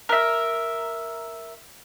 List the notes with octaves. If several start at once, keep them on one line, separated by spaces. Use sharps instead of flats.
A#4 E5